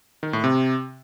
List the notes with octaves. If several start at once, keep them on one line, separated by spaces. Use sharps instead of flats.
D#3
A2
C3